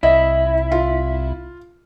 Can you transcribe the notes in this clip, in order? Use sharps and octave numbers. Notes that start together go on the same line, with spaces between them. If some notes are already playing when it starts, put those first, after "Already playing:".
C2 E4 D#5 E5
F4